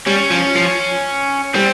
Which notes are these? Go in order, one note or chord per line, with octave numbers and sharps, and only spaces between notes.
G3 C#4
F3
F3
G3 C4